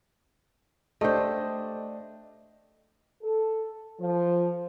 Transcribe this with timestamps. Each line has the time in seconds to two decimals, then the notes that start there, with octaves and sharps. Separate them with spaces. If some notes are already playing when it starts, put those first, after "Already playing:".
1.01 A3 D4 G4 C5 D#5
3.22 A4
3.99 F3